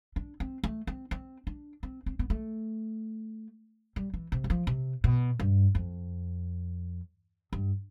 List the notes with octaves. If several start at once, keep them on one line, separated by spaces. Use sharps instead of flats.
D4
C4
A3
C4
C4
D4
C4
C4
B3
A3
G3
E3
C3
G3
F3
C3
B2
G2
F2
G2